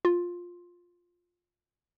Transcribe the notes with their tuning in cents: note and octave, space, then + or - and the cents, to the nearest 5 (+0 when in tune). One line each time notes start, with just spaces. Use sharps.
F4 +10